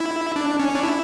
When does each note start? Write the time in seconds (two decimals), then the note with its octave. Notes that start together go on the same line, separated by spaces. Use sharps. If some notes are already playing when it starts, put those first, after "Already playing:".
Already playing: E4
0.36 D4
0.60 C#4
0.75 D4
0.83 E4